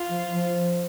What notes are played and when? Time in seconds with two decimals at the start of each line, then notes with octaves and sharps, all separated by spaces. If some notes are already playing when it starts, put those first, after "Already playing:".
Already playing: F4
0.09 F3
0.30 F3